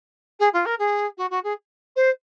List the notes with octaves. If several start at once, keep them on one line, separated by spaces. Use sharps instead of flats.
G#4
F4
A#4
G#4
F#4
F#4
G#4
C5